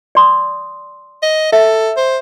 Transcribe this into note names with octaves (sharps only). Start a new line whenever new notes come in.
D5 C6 D#6
D#5
A4 E5
C5